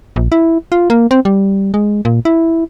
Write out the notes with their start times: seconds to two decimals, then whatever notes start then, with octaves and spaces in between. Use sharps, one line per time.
0.16 A#1
0.32 E4
0.72 F4
0.90 A#3
1.11 C4
1.25 G3
1.74 G#3
2.05 A#2
2.25 E4